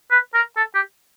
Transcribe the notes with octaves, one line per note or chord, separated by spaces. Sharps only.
B4
A#4
A4
G4